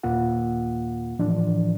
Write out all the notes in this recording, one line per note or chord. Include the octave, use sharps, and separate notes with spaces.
D#2 A#2 A#3 F4 F#5
A2 E3 F3 D4